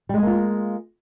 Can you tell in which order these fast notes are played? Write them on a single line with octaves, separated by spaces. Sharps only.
G3 G#3 G#4 A#3 F4